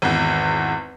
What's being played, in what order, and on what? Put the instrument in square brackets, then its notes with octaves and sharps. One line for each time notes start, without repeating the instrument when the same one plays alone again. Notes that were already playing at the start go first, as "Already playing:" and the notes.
[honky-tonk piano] G#1 E2